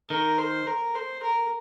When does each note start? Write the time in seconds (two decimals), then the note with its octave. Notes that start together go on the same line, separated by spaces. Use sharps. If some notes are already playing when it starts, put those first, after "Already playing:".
0.10 D#3 A#4
0.38 C5
0.67 A#4
0.95 C5
1.23 A#4